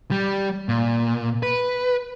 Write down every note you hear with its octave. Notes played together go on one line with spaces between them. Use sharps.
G3
A#2
B4